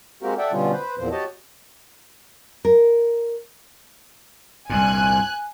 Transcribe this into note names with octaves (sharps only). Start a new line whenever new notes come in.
G#3 A#3 C4 F#4 G4 A#4
A4 D5 E5 F#5 G5
B2 D3 G3 B3 C#4 F4
B4 C5
E2 A#2 F3 C4 C5
F#4 G4 C#5 D#5 A5
A#4
C2 G2 A#2 G#5 F#6